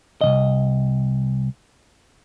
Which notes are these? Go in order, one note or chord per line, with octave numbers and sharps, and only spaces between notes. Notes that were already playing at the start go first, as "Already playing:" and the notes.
C2 C3 D#5